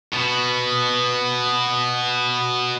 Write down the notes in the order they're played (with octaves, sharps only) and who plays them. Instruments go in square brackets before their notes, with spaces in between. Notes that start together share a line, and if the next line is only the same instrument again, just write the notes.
[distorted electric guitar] B2 B3